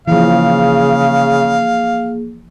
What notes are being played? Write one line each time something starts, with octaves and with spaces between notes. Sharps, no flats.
C#3 E3 F3 A#3 G#4 F5